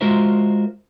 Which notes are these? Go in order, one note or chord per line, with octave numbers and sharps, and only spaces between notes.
G#3 F4 F#4 A#4 C5 E5